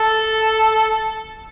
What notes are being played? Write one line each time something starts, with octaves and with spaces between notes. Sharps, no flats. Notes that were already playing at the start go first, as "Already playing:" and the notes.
Already playing: A4